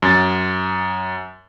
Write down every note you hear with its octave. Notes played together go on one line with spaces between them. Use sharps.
F#2 A6